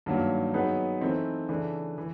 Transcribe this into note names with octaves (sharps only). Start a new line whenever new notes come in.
G2 D#3 F#3 A#3
F#3 B3 D#4 G#4 B4
E3 A3 C4 D#4
C#3 E3 A3 D4
E3